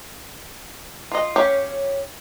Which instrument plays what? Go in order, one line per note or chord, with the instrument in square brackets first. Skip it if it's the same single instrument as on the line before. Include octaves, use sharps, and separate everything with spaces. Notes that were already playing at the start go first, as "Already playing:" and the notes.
[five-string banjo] F4 D#5
C#4 G4 C#5 F5 G5